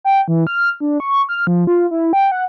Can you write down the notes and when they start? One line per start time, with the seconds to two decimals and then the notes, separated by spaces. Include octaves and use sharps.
0.04 G5
0.28 E3
0.47 F6
0.80 D4
1.00 C#6
1.29 F6
1.47 F3
1.67 F4
1.91 E4
2.13 G5
2.32 F#5